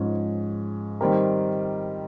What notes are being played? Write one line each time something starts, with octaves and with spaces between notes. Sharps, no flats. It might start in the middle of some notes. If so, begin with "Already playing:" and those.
Already playing: G#2 F3 G#3 C#4
D#3 G3 C4 G4 A#4